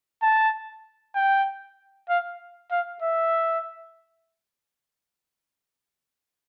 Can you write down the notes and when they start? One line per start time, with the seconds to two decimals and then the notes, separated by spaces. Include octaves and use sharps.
0.22 A5
1.15 G5
2.09 F5
2.71 F5
3.02 E5